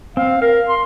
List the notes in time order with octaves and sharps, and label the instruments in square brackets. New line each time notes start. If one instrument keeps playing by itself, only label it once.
[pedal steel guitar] C4 [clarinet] F5
[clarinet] A#4 [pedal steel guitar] F5
[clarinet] C6